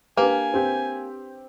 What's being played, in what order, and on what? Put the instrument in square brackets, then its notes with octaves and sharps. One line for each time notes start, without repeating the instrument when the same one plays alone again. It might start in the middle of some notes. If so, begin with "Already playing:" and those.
[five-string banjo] A#3 [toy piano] D4 B4 [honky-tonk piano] G4 [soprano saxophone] G#5
[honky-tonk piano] C4 G4 G6